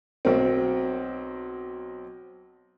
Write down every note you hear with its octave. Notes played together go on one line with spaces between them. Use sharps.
B1 C4